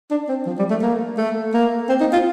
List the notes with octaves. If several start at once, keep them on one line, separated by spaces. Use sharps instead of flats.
D4
C4
F3
G3
A3
A#3
A3
A#3
C4
D#4
F4